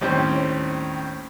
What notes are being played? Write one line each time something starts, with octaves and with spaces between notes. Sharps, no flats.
D#2 A2 G3 C4 C#4